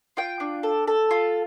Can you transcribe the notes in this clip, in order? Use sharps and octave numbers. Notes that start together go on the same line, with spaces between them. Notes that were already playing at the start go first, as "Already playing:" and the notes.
F4 G5
D4
A4
A4
F4